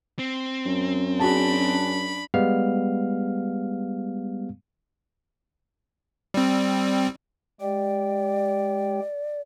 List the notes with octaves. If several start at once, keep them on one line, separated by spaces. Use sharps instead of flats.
C4
F#2
D4 F#4 G#4 A5 B5
G3 G#3 B3 F5 F6
G3 C4
G#3 G4 D5 G5